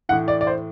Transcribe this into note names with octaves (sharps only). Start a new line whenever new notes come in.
A2 E3 F#5
D5
D5
C5